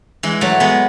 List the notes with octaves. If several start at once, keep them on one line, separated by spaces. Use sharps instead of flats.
E3 G#3
F#3 A3
G#3 B3